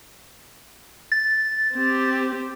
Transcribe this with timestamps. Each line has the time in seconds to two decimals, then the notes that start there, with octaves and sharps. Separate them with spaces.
1.12 A6
1.73 C4 G4